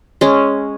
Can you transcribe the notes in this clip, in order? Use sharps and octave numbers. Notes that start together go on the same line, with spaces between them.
G#3 C#4